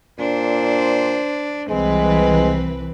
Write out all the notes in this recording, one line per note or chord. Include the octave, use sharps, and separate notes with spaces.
A#2 D4 C5
C2 E3 G#3 C4 B4